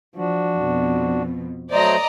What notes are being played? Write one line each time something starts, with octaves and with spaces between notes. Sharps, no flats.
F3 D4 F#4
F2 B2
F#3 A3 C5 D5 D#5 A#5